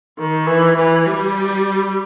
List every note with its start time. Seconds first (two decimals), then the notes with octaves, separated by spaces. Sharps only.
0.18 D#3
0.47 E3
0.77 E3
1.06 G3